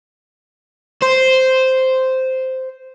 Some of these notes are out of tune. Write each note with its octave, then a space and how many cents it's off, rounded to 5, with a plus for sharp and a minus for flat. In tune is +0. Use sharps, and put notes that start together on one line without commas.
C5 -5